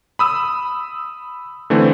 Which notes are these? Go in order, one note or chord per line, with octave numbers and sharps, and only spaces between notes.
B5 D#6 E6
D3 E3 A3 C4